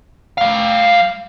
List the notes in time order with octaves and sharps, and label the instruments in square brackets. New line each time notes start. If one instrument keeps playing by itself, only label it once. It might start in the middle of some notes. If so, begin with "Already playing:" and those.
[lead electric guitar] G3 F5